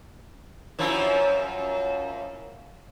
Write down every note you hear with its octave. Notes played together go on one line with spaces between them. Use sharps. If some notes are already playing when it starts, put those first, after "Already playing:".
F#2 F3 E4